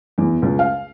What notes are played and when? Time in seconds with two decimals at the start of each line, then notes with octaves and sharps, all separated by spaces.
0.18 E2
0.42 C#2
0.59 F5